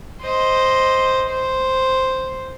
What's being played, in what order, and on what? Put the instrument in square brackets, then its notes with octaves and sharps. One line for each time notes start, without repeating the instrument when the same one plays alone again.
[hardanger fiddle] C5 D#5
C5